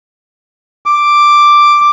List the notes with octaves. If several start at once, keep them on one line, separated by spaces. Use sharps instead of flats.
D6